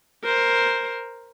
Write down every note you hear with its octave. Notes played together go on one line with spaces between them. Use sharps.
A#4 C5